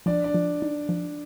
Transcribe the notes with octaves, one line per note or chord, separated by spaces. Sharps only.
F3 D4 D5
D4 D5
F3
D#4
F3